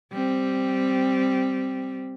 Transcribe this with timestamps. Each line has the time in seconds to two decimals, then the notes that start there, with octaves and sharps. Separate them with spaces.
0.12 G3 C4